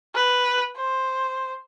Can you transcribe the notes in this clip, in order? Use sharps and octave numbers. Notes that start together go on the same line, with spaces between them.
B4
C5